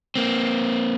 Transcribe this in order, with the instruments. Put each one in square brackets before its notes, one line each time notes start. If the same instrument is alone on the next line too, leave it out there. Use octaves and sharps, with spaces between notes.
[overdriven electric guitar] A#3 C4